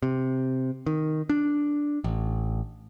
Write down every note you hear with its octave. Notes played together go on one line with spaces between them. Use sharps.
C3
D#3
D4
A1